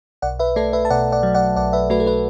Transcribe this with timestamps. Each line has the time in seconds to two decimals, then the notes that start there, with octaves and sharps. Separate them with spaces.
0.22 B1 D5 F#5
0.39 B4 E5
0.56 A3 A4 D5
0.73 B4 E5
0.85 A5
0.90 B2 D5 F#5
1.12 D5 F#5
1.23 F#3
1.34 D5 F#5
1.56 B1 D5 F#5
1.73 B4 E5
1.90 A3 F#4 B4
2.00 A4
2.06 F#4 B4